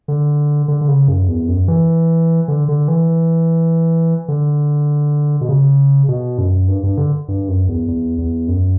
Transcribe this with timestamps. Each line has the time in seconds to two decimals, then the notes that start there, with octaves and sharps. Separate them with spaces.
0.08 D3
0.68 D3
0.81 D3
0.88 C#3
1.08 F#2
1.28 E2
1.48 F#2
1.68 E3
2.48 D3
2.68 D3
2.88 E3
4.28 D3
5.41 B2
5.49 C#3
6.08 B2
6.38 F#2
6.68 G2
6.83 G2
6.98 D3
7.28 G2
7.48 F#2
7.68 E2
7.88 E2
8.18 E2
8.48 F#2